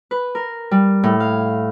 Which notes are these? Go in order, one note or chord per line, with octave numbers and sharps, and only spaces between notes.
B4
A#4
G3
A2
F5